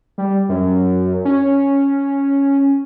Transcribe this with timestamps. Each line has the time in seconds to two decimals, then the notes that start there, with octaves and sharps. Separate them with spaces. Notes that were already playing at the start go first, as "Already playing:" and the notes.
0.18 G3
0.49 F#2
1.25 C#4